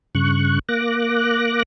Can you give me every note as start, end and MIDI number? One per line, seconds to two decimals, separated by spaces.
0.15 0.59 43
0.15 0.59 49
0.15 0.59 85
0.15 0.59 90
0.69 1.63 58
0.69 1.63 86
0.69 1.63 90
0.69 1.63 94